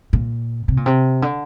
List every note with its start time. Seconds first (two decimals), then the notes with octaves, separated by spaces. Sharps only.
0.13 A#2
0.68 C3
0.77 A#2
0.86 C3
1.22 D3